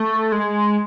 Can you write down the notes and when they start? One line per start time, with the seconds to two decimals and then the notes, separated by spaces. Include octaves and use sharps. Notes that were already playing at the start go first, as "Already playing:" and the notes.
Already playing: A3
0.32 G#3